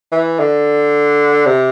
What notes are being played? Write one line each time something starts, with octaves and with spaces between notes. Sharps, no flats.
E3
D3
C3